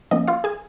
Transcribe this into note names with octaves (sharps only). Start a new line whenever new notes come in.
F3 A#3 C#4 D#5
F4 F5
G#4 G#5